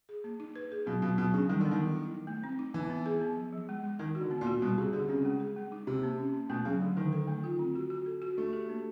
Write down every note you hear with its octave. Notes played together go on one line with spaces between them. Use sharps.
G#4
A#3
D#4
B4
G#4
B2 F#3
B2 F#3
B2 F#3
C#3 D4
D#3 G3
D3 B3
D#3
E4
E4
D#4
A3
C4
D#4
E3 B3
B3
G#4
B3
F3
F3
G#3
G#3
D#3 A#4
F#4
D3
B3
A#2
F#4
B2 G3
C3 G#4
D3 G#4
C#3 C4
G#3
G#4
G#3
D#4
C3 G4
A#3
C#4
A#3
B2 A3
C#3 F#3
D3 F#3
D3 D#3
A4
A3
F4
C4
F#4
F#4
A4
F#4
A3 D4
G4
A#3